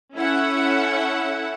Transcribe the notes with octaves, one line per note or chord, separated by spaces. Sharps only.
C#4 E4 A4 E5 F#5